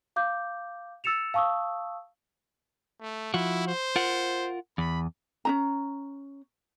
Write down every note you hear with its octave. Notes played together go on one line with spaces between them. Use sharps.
F5 D6 G6
E6 A6 C#7 E7 F7
F5 A5 C#6 D#6 E6
A3
F3 E4 F#4
C5
F4 A#4 F#5
E2 B5
C#4 D#4 A#5